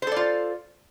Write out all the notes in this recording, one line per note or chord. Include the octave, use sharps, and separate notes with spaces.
F4 A4 C5 D5